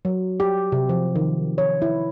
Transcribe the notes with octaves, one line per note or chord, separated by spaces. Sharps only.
F#3
G4
C3
F3
D#3
C#5
E4